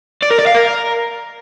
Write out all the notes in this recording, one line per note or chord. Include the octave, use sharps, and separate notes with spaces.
D5
A#4
D5
F5
A#4